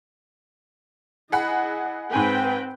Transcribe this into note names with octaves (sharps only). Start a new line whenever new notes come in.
E4 G#4 D#5 F#5 B5
G#2 C4 B4 G5 G#5